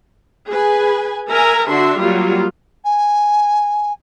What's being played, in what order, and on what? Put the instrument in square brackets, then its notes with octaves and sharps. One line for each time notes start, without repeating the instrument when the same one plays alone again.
[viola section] G#4 B4 G#5
A#4 E5 G#5 A#5
D3 D4 F#4 E5 C6
F#3 G3 A#3 F4 G4
[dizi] G#5